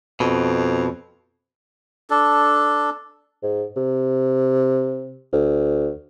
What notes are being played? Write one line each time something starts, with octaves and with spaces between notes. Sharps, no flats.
F2 B2
D4 A4
G#2
C3
D2